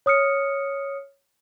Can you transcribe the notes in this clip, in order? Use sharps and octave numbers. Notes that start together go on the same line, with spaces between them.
C#5 D#6 F6 C#7